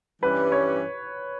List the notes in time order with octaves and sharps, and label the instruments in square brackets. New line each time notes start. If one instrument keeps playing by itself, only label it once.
[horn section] G2 E3 G3 C#4 [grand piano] B4
[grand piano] C#5